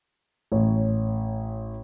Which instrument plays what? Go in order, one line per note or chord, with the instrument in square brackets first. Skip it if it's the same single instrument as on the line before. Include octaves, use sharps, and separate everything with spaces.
[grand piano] A1 C#5